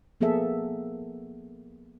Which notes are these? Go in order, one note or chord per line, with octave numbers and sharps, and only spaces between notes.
F3 A#3 B3 G#4 A4 E5